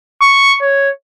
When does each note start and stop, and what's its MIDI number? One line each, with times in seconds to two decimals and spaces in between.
0.22 0.55 85
0.61 0.89 73